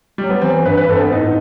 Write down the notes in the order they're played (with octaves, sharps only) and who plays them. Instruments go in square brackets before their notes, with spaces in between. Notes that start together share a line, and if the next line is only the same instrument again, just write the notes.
[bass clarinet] F#3 [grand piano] G3
[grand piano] B3
[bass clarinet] E3 [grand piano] C4
[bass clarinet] G2 [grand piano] B4
[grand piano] B4
[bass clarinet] G2 [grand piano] A4
[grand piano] C4
B3
[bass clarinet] A2 [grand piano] D#4